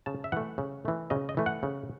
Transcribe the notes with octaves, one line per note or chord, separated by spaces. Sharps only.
C#3 A5
E5
E3 A3 F#5
C#3
E3 A3
C#3 D#5
D#5
E3 A3
F#5
C#3